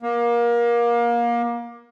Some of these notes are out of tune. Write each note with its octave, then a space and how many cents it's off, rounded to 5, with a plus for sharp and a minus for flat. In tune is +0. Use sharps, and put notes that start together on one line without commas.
A#3 +25